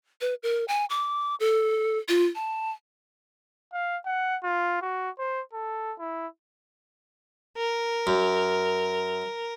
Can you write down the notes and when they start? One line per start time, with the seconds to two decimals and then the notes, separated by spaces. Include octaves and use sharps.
0.21 B4
0.43 A#4
0.68 G#5
0.90 D6
1.40 A4
2.08 F4
2.35 A5
3.73 F5
4.06 F#5
4.43 F4
4.82 F#4
5.19 C5
5.53 A4
5.99 E4
7.57 A#4
8.07 F#2